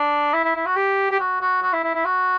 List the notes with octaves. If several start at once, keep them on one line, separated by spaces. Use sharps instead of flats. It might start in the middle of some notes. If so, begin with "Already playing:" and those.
Already playing: D4
E4
E4
E4
F#4
G4
G4
F#4
F#4
F#4
E4
E4
E4
F#4